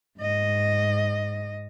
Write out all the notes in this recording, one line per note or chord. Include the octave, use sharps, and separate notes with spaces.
G#2 D#5